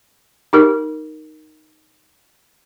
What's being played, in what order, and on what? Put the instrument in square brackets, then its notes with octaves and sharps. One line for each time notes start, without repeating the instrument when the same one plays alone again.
[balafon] D#4 G4 A#4